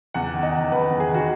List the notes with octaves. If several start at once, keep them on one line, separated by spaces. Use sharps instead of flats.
E2 F#5
D#3
D#5
D#3
E2 B4
E2
G#4
D#3
F#4